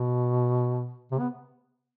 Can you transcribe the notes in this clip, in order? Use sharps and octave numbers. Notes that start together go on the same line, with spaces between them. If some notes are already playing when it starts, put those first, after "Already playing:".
Already playing: B2
C3
B3